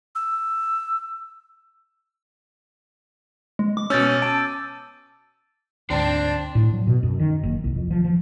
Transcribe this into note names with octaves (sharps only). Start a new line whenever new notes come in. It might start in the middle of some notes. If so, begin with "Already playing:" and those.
E6
G#3
D6
B2 C#4 E6 G6 A6
D#7
A5 D7
D2 G#2 C4 D4 D5 A5
A2
F#3
B2
F#2
D#3
F#1
C2
F2
F3
F3